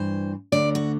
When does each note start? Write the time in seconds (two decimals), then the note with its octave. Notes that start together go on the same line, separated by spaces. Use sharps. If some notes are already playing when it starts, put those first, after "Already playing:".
Already playing: G2 E3 C5
0.52 D2 D3 D5
0.75 F#4